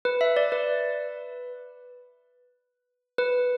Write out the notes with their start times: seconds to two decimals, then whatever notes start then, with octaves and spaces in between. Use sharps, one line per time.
0.05 B4
0.21 E5
0.37 D5
0.52 B4
3.18 B4